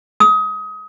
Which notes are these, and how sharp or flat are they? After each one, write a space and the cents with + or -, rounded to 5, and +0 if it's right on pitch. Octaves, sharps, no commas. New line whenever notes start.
D#6 +25